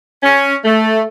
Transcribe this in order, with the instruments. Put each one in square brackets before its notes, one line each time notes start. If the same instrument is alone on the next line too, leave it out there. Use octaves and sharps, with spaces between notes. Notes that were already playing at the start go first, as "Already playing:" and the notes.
[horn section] C#4
A3